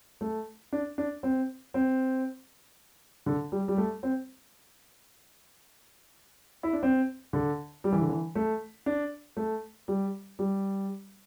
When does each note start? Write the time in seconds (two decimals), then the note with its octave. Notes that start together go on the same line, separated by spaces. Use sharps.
0.21 A3
0.73 D4
0.98 D4
1.23 C4
1.74 C4
3.26 D3
3.52 G3
3.68 G3
3.78 A3
4.03 C4
6.63 E4
6.73 D4
6.83 C4
7.33 D3
7.84 G3
7.92 E3
8.01 D3
8.09 E3
8.35 A3
8.86 D4
9.37 A3
9.88 G3
10.39 G3